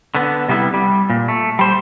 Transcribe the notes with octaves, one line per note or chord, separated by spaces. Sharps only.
D3 B3
C3 G3 B3 E4
G3
A#2
A3
G3 C5